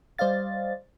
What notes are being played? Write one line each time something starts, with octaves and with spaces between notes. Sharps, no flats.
G3 C5 D5 D#5 F5 A6